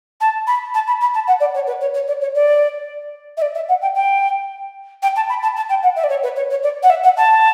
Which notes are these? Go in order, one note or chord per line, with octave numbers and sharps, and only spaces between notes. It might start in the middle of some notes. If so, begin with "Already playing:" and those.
A5
B5
A5
B5
B5
A5
F#5
D5
C#5
B4
C#5
C#5
D5
C#5
D5
E5
D5
E5
F#5
G5
G5
G5
A5
B5
A5
A5
G5
F#5
E5
D5
C#5
B4
C#5
C#5
D5
F#5
E5
F#5
A5